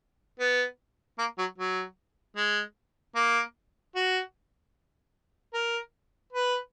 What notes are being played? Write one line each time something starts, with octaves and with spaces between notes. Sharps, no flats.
B3
A#3
F#3
F#3
G#3
A#3
F#4
A#4
B4